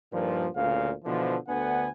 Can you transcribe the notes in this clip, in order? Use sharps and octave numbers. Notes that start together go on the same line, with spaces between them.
G2 A#2 D#3 F3
D2 A#2 C#3 F5
B2 D3 E3 F3
D2 D3 B3 F#5 G#5